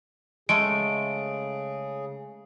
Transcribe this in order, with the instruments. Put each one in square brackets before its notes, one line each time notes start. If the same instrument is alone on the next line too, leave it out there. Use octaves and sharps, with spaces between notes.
[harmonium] C#3 G#4 [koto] G#3 A3 A4 [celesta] D7